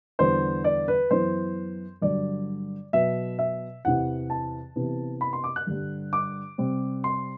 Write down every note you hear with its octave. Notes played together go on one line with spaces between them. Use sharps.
E2 D3 G3 B3 C5
D5
B4
F#2 E3 B3 C5
G2 D3 F#3 D5
B2 F#3 B3 E5
E5
E2 C3 E3 F#5
A5
C3 E3 B3
B5
C6
D6
F#6
G2 D3 G3
D6
C3 G3 C4
C6